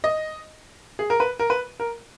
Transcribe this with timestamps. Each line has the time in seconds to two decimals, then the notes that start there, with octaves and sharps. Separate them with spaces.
0.04 D#5
0.99 G#4
1.10 A#4
1.20 B4
1.40 A#4
1.50 B4
1.80 A#4